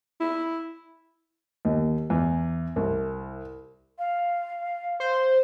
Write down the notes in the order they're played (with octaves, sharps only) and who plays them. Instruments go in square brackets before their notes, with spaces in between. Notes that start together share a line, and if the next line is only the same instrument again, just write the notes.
[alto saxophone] E4
[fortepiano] D#2
E2
C2
[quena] F5
[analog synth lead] C5